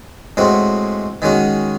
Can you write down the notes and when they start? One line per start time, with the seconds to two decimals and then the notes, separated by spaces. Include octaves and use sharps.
0.37 A2 G#3 C4 F#4
1.22 D#3 G#3 C#4 F#4